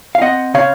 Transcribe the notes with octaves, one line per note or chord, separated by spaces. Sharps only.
F5
C4 D#5 F#5
C#3 C#5 F5